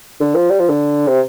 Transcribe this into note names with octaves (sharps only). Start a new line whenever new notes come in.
D3
F3
G3
F3
D3
C3